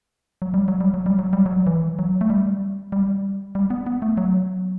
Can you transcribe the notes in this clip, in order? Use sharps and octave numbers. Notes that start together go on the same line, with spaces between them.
F#3
G3
F#3
G3
F#3
G3
F#3
G3
F#3
E3
F#3
A3
G3
G3
G3
B3
B3
A3
F#3